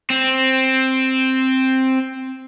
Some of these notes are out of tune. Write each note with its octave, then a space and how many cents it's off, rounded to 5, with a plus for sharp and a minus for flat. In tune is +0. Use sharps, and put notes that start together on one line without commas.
C4 +5